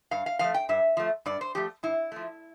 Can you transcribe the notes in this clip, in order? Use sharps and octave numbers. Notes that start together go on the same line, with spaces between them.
G2 F5
F5
F3 A3 F5
G5
G2 E5
F3 A3
G2 D5
C5
F3 A3 G4
G2 E4
F3 A3